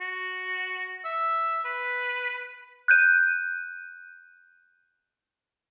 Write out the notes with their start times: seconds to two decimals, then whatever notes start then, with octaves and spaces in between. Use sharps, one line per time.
0.01 F#4
1.05 E5
1.65 B4
2.88 F#6 G6 D#7